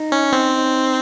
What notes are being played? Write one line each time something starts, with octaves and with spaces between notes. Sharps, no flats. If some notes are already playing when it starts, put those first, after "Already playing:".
Already playing: D#4
C#4
C4